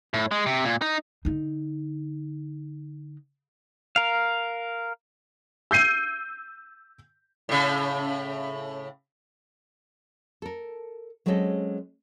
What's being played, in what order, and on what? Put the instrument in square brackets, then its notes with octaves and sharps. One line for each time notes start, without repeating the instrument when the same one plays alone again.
[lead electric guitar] A2
G#3
C3
A#2
D#4
[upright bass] D3 D#4
[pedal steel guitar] A#4 F5
[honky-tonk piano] E6 G6 C7 D#7
[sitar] A2 C#3
[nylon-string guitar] A4 A#4
F#3 G#3 C4 C#4 A4 D#5